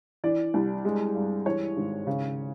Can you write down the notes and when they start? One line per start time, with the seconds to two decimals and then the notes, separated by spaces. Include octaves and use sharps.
0.24 E3 D5
0.54 C2
0.85 G#3
1.15 G2
1.46 E3 C#5
1.77 G#1
2.07 C#3